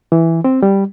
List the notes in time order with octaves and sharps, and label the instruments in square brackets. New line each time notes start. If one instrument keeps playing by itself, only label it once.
[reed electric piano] E3
C4
G3